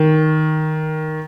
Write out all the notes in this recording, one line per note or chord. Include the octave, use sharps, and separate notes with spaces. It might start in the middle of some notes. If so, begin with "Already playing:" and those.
Already playing: D#3